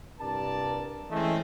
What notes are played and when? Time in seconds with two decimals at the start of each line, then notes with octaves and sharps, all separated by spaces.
0.20 C2 G2 A#4 D5 A5
1.11 E3 G#3 A3 C4 C#4 D#5